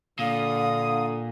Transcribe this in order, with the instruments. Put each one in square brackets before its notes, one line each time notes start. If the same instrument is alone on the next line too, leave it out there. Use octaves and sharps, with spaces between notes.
[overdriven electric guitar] A#2 [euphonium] D3 [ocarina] F5 [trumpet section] D#6